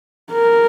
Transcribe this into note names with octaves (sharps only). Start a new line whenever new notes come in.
A#4